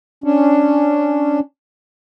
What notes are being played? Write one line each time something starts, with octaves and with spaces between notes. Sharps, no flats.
C#4 D4